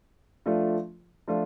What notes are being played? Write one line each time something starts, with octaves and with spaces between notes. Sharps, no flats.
F3 A3 D4 F4
F3 A3 D4 F4